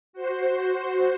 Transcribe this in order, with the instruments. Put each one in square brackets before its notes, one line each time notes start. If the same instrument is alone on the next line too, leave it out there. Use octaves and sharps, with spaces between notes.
[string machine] F#4 C5